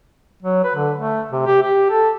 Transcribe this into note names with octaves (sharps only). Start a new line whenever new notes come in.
F#3
B4
D3
A3
C3
G4
G4
A4